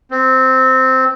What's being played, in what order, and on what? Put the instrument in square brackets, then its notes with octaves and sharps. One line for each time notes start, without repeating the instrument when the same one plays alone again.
[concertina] C4